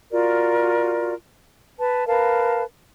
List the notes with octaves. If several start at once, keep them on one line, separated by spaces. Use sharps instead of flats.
F4 F#4 A#4 D5
B4 A5
A#4 B4 F5 A5